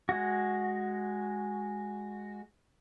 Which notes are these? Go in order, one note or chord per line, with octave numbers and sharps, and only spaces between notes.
G#3 F#4